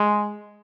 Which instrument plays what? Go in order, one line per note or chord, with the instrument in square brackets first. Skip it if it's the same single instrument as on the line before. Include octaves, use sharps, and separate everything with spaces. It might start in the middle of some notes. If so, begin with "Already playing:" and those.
Already playing: [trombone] G#3